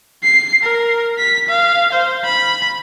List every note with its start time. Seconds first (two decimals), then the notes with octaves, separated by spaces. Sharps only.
0.23 C7
0.63 A#4
1.19 B6
1.49 F5
1.93 C5
2.24 B5